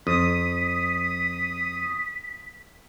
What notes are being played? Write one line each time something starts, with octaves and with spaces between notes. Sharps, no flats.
F2 D#6 B6